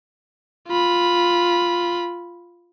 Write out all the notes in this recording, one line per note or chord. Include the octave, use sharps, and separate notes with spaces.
F4 B5